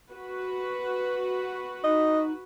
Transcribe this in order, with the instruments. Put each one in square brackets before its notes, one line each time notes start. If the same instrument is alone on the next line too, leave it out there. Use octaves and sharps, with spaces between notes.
[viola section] F#4 B4
[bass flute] D#4 [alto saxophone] D#5